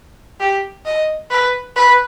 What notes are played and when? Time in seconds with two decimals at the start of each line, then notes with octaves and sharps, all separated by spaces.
0.40 G4
0.86 D#5
1.30 B4
1.76 B4